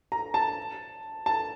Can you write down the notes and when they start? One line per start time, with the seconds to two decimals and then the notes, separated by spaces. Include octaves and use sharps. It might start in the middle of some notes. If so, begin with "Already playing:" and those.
0.12 A#5
0.34 A5
1.26 A5